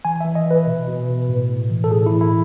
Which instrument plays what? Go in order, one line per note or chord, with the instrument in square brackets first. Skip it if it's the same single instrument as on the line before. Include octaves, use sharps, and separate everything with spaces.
[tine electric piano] E3 G#5
E5
E3
D#5
E3 B4
B2
B2
B2
A2
A2
E3
A4
A2 G#4
E4
E3
E4